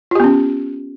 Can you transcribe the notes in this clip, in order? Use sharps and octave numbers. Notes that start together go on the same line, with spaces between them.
B3 C#4 F4 G4